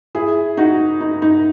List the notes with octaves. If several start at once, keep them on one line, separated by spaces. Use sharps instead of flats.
E4 G#4
D#4 F#4
D#4
D#4